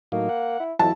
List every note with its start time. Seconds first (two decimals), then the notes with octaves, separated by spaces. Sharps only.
0.12 A2 F#3 A#3 D#4
0.29 F#5
0.59 E4
0.79 F2 E3 F#3 E4 A5